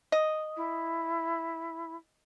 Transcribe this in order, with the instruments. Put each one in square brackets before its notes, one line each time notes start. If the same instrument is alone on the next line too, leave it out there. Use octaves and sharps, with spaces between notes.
[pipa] D#5
[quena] E4